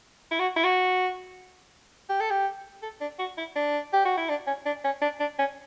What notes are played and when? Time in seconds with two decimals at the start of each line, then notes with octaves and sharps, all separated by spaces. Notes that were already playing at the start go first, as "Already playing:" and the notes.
0.31 E4
0.40 F#4
0.56 E4
0.64 F#4
2.10 G4
2.20 A4
2.30 G4
2.83 A4
3.01 D4
3.19 F#4
3.38 E4
3.56 D4
3.93 G4
4.05 F#4
4.18 E4
4.29 D4
4.47 C#4
4.66 D4
4.84 C#4
5.02 D4
5.20 D4
5.39 C#4